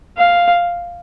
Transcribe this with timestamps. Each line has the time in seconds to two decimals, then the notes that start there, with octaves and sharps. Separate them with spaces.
0.18 F5